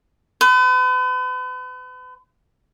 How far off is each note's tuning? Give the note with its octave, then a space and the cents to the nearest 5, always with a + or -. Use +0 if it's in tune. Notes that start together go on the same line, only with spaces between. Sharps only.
B4 +40